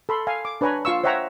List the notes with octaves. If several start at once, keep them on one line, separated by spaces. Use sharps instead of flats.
A4 B5 C6
F5 G#5
D6
D4 B4 C#5 G#5 A#5 B5
F4 F5 C#6 E6
C5 C#5 E5 F#5 G5 A#5